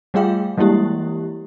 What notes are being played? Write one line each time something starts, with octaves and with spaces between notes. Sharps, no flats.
G3 A3 F4 G#4 F5 G5
E3 G3 G#3 A#3 E4 G4